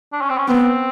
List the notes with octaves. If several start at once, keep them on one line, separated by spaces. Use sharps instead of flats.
D4
C#4
C4
C#4
B3 C4